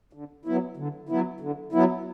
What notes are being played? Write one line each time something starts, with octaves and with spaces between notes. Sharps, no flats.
D3
F#3 B3 E4
D3
F#3 B3 E4
D3
F#3 B3 E4